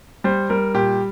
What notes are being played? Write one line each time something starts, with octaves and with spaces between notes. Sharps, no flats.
G3 C5
G3 A#4
A#2 G4